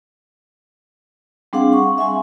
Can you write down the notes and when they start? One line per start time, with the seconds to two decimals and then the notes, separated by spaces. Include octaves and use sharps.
1.53 G3 C4 D4 G#4 F5 F#5
1.73 C#6
1.98 E5 F#5 G#5 C6